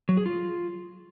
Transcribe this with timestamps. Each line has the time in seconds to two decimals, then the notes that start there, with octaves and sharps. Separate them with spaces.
0.09 F#3
0.17 G#4
0.26 F4